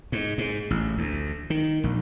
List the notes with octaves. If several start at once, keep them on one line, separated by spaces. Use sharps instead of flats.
G#2
G#2
A1
D2
D#3
A#1